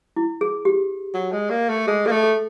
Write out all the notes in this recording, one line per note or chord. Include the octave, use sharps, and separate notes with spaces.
E4
G#4
G4
F#3
G#3
A#3
A3
G#3 G#4
A#3 A4
A3
A4